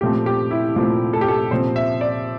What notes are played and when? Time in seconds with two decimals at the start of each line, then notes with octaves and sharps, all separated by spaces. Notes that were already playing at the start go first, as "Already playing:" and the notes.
0.01 A#2 F3 A3 C4 G4
0.26 G4
0.51 E4
0.76 A#2 F3 A3 C4 F4
1.13 A4
1.21 G4
1.28 A4
1.51 A#2 F3 C4 C5
1.76 E5
2.01 D5